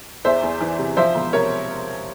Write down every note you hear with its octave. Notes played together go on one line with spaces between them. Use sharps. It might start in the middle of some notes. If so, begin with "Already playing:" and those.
E2 C5 E5
E2
E3
C3
F3 C5 E5
E1
C3 A#4 C#5